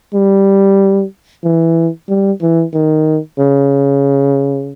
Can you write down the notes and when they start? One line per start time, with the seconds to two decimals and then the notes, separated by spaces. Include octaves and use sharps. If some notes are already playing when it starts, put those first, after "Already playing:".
0.14 G3
1.44 E3
2.09 G3
2.42 E3
2.73 D#3
3.39 C#3